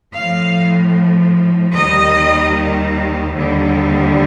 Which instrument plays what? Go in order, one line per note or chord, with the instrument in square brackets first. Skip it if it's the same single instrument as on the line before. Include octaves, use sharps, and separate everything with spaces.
[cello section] A2 F3 F5
D#2 D#3 G3 D#5
D#2 D3 G3